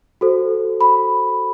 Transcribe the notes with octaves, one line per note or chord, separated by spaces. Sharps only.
F#4 A4 C5
B5